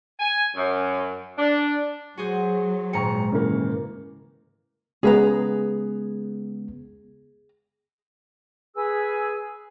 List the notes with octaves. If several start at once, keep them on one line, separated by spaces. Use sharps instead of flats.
G#5
F#2
D4
F#3 F#4 G#4 C5
D#1 G#2 G5 A#5 C#6 C#7
C#3 E3 A#3
C#3 G#3 B3 G#4 B4 A#5
G#4 B4 G#5 E6